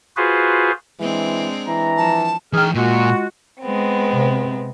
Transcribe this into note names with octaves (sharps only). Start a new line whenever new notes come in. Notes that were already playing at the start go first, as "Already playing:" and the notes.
F4 F#4 G#4 B4 C5
E3 G#3 C4 D4
E3 A#5
F3 A5
E3 D#4 G#4 G5 F6
A#2 G#3 F4 F#4
G#3 B3 C4
C3